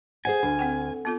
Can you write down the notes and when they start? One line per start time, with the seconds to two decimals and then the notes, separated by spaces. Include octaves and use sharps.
0.25 G#4 C5 F#5 G#5
0.43 D2 D4
0.59 C4 F#5 G5
1.05 B3 F4 A4